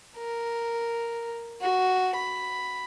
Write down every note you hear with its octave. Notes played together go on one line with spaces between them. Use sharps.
A#4
F#4
B5